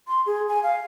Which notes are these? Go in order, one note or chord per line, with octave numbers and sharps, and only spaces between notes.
C6
G#4
G#5
F5